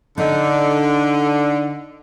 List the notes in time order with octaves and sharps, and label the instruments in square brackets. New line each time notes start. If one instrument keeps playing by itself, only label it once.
[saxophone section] D3 [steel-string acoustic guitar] D#4